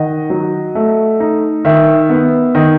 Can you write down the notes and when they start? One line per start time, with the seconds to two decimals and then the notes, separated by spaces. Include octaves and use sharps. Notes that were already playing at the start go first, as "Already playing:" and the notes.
Already playing: D#3 D#5 F#5
0.30 F#3
0.75 A3
1.20 D#4
1.65 D#3 E5
2.10 B3
2.55 D#3 D#5